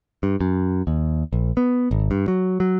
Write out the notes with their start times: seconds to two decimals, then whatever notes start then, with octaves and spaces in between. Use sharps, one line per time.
0.23 G2
0.41 F#2
0.87 D#2
1.33 A#1
1.57 B3
1.91 G#1
2.11 G2
2.28 F#3
2.60 F#3